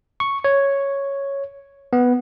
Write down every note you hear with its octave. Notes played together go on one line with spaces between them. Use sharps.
C#6
C#5
B3